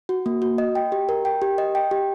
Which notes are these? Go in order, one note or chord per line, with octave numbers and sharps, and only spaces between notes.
F#4
A#3
F#4
D#5
G5
G4
A#4
G5
G4
D#5
G5
G4